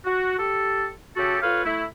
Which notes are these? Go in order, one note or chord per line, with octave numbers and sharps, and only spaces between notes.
F#4
G4 A4
C#3 F#4 G4 A4
F4 A4 B4 C#5 F5
A3 E4